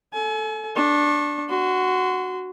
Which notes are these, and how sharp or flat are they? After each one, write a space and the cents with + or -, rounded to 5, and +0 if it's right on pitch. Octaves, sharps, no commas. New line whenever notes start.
A4 +0 G#5 +40
D4 +0 C#6 -30
F#4 +0 C6 -25